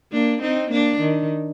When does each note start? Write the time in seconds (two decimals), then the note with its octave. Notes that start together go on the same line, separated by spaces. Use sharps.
0.12 A#3 D4
0.42 C4 D#4
0.71 A#3 D4
1.00 D#3